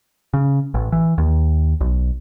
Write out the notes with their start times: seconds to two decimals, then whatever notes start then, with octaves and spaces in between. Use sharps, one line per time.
0.34 C#3
0.74 A1
0.92 E3
1.18 D#2
1.81 B1